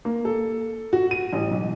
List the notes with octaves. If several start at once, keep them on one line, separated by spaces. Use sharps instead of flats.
A#3
A4
F#4
D#7
A1
B1